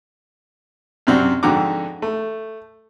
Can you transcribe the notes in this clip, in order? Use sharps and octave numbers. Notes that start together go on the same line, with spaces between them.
F#2 C3 C4 D4 F#4
F2 G#2 D3 F#4 A#5 D6
A3